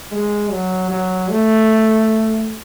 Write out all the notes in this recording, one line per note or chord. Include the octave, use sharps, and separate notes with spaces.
G#3
F#3
F#3
A3